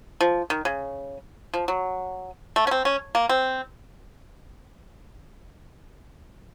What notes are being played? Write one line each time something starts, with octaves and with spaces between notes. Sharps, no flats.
F3
D#3
C#3
F3
F#3
A3
C#4
C4
C#4
A#3
C4